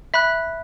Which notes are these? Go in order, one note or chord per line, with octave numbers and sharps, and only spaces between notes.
E5 B5 F#6